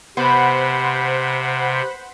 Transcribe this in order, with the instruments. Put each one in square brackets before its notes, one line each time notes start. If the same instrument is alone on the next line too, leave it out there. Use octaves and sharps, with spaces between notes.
[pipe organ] C3 [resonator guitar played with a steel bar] B3 [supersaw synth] C5 F#5 B5